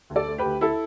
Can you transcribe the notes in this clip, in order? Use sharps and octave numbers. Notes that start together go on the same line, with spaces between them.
D2
A4 D5
A3
G4 B4
D2
E4 A4